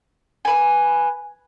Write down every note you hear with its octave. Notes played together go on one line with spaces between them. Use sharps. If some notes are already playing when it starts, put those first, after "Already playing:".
B4 G#5